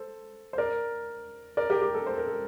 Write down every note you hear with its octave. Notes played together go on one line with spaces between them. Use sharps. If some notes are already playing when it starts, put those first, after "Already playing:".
Already playing: A4 C5
C5
A#4 D5
A#4 D5
G4 A#4
G4
A4
C5
A#4
A4